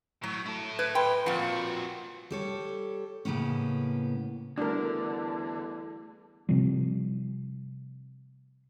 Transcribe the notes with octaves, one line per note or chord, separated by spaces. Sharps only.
A2 F#3
E4 A4
B4 G#6
B4 G5 B5 C6
F2 A#2 F3 F#4 F#5
G3 A4 C#5
A2 C#3 A#3 B3 C#4
E2 D3 G3 A3 D4 F#4 A#4
C3 F3 G3